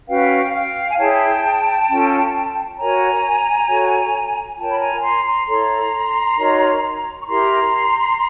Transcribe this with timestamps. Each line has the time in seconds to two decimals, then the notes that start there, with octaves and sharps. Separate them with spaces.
0.08 C#4 F#4 B4 F5 G5
0.54 F5 G5
0.89 G#5
0.98 E4 G#4 C#5 G5 A5
1.89 C#4 F4 A4
2.78 F#4 A#4 C#5 G#5 A#5
3.69 F#4 A4 C#5
4.58 F4 A#4 C#5 G5 A5
4.70 B5
4.80 G#5 A#5
5.03 A#5 C6
5.25 A#5 C6
5.47 E4 A4 C#5 A#5 C6
6.37 D#4 F#4 A#4 C#5
7.23 C#6
7.27 E4 G4 A#4 A#5 C6